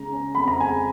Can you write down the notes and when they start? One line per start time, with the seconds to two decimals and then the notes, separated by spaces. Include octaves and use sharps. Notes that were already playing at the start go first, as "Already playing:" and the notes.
Already playing: C#3 G#3 A#5
0.12 C#4
0.35 F2 B5
0.48 A#5
0.60 G#3 G#5